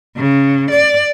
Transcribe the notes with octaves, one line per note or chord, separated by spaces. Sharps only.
C#3
D5